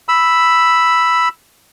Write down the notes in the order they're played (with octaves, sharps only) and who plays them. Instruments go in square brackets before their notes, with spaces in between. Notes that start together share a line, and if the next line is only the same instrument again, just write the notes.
[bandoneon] B5 E6